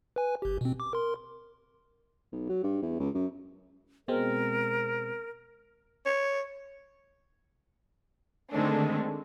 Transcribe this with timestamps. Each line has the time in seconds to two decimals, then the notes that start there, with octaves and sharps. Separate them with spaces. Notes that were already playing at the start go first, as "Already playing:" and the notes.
0.16 B4 G#5
0.42 G1 G4
0.61 B2 C4
0.80 D6
0.93 A#4 C6
2.32 B1
2.49 F#3
2.63 G2
2.82 E2
3.00 C#2
3.15 F#2
4.08 B2 G#3 C4 A#4
6.06 C#5
8.51 D3 D#3 G#3 A3 C4 D4